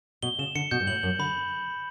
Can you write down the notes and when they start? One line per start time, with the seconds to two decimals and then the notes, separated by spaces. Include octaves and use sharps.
0.23 B2 G7
0.39 C#3 E7
0.55 D3 C#7
0.71 B2 G6
0.80 G2
0.87 A2 F#7
1.03 F#2 F#7
1.19 D3 B5